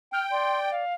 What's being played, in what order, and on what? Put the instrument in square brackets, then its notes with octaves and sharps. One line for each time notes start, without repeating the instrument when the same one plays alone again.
[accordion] G5 [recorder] F6
[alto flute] D5 [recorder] C6
[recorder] F5